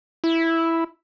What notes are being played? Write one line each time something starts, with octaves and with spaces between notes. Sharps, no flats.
E4